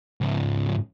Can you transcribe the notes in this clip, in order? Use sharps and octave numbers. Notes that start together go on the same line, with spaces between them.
C#2 G#2